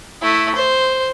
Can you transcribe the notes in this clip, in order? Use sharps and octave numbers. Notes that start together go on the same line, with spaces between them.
A3 E4
C5